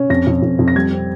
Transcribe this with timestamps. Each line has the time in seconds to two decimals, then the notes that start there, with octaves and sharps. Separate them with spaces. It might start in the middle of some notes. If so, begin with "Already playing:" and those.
Already playing: C#4
0.10 F2 A#6
0.27 F2
0.43 F2
0.59 F2
0.68 A#6
0.75 G3 G#6
0.93 C4